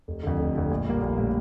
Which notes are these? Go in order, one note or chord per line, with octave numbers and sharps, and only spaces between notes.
F1
F2 D3
F1
F2 D3
A#1
A2 G3 A#3
A#1
A2 G3 A#3